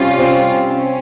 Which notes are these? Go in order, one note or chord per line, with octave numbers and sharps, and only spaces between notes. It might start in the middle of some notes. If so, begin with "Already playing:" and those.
Already playing: C3 G3 C#4 F4
C4
C#4